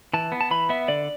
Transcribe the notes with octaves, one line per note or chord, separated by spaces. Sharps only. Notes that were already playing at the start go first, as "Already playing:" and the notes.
E3 A5
B3
A5
E3 B5
B3 E5
D3 D5